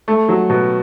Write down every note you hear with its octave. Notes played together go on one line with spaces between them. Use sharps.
A3
F#3
B2